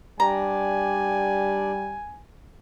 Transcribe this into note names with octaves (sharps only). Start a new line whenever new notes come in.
G3 D4 G4 D5 G#5 A#5